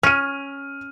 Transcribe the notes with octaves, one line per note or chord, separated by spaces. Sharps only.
C#4 F6 D#7